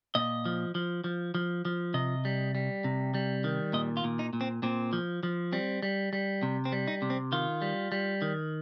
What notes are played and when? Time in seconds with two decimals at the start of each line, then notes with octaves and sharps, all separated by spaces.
0.15 A#2 D#5
0.45 F3
0.75 F3
1.04 F3
1.35 F3
1.65 F3
1.94 C3 D#5
2.25 G3
2.55 G3
2.84 C3
3.15 G3
3.44 D#3
3.73 A#2 D#5
3.97 F4
4.04 A#2
4.19 D#4
4.33 A#2
4.41 C4
4.63 A#2 C4
4.93 F3
5.23 F3
5.52 G3 C4
5.83 G3
6.13 G3
6.43 C3
6.65 C4
6.72 G3
6.88 D#4
7.02 C3
7.10 C4
7.32 D#3 F4
7.62 G3
7.92 G3
8.22 D#3